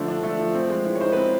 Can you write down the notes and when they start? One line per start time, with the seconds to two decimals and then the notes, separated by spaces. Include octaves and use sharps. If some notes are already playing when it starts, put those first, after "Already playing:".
Already playing: D3 F3 A3 D5
0.08 D4
0.24 A3
0.39 F3
0.55 C4
0.70 G#3
0.85 E3
0.95 C#5
1.01 D#4 C5
1.12 C4 B4